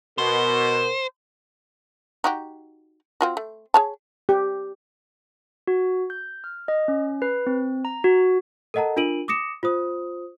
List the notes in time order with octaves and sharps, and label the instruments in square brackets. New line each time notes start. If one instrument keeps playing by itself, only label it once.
[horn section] B2 [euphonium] A#4 [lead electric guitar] C5
[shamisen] D#4 F#4 G4
C4 F4 F#4
A3
G#4 C#5 A5
[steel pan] G4
[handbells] F#4
G6
F6
D#5
C#4
B4
C4
A#5
F#4
[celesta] A4 A#4 D#5 F#5 A5 A#5
D4 F4 A#4 D7 D#7 F#7
D6 D#6 A#6 C#7 E7
F4 C5 D#6